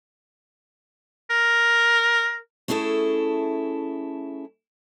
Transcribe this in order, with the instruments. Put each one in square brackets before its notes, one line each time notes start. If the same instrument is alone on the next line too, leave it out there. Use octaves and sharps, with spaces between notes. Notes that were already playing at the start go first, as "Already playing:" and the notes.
[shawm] A#4
[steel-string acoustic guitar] A3 C#4 E4 G#4 A4